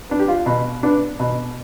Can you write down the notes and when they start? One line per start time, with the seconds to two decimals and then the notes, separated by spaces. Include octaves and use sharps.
0.09 B3 D4
0.20 G4
0.28 F4
0.46 B2
0.83 B3 D4
1.20 B2